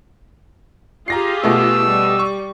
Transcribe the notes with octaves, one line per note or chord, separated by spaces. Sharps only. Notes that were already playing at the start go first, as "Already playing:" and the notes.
F4 G4 G#4 A#5 A#6 C7
B2 A3 B3 E6
G3
C#6